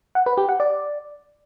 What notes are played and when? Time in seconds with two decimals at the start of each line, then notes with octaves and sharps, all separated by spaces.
0.15 F#5
0.26 B4
0.37 G4
0.49 F#5
0.60 D5